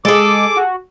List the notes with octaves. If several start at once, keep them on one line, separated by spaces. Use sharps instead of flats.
G#3 G#4 A4 D6
F#4